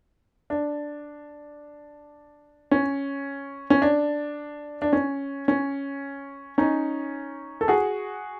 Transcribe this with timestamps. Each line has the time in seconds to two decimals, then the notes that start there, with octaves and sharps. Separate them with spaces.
0.50 D4
2.71 C#4
3.70 C#4
3.82 D4
4.82 D4
4.93 C#4
5.48 C#4
6.58 C#4 D#4
7.61 A4
7.68 F#4 G#4